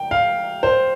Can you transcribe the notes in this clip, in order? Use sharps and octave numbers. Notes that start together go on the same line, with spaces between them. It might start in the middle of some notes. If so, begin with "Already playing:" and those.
Already playing: G5
F5
C5